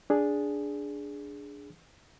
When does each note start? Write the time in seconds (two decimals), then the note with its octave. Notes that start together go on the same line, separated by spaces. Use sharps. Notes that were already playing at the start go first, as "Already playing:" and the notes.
0.10 D4 G#4